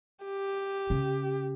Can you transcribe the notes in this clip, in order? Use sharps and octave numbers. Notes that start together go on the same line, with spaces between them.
G4
C#3